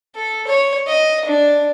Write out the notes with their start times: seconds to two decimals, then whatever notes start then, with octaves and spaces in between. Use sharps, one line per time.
0.16 A4
0.47 C#5
0.87 D#5
1.26 D4